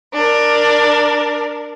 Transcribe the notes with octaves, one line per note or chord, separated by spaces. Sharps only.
D4 A#4